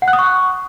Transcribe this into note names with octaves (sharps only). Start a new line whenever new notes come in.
F#5
F#6
D#6
C#6